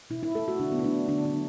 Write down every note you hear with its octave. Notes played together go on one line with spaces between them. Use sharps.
B2 E4
E4
A3 A4
F#4
D3 D4
B3
E4
F#3 A3 D4
D3 D4
D4
F#3